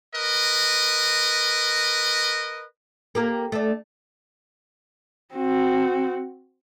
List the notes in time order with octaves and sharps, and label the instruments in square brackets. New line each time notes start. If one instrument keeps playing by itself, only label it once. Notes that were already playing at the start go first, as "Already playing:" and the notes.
[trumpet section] A#4 B4 D#5
[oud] A#3 G4 A#4
A3 D4
[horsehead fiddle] C4 F#4